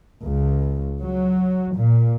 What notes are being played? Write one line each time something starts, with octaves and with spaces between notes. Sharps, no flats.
C#2
F#3
A#2